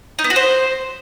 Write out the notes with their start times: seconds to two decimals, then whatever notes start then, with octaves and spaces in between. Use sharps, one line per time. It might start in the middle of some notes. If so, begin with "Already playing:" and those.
0.19 D#4
0.24 B3
0.30 F#4
0.36 C5